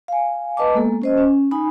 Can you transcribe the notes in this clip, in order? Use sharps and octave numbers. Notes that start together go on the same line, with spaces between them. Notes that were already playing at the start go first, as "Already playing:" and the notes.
F5 G#5
B4 D#5 A5 D6
G#3 A#3 B3 A4
C#4 C5 D#5
C#4
D#4 G#5 B5